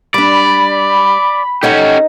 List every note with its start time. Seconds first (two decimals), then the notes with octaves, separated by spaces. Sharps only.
0.14 G3 D4 D5 B5
1.63 C#4 D#4 G4 A4 C#5 F#5